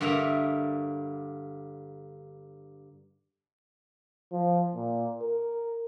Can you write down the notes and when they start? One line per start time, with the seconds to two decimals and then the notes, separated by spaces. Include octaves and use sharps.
0.01 G2 D3 A#3 E5 A#5
4.32 F3
4.74 A#2
5.22 A#4